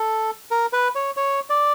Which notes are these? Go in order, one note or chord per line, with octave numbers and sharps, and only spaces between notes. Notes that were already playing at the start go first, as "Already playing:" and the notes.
Already playing: A4
A#4
B4
C#5
C#5
D5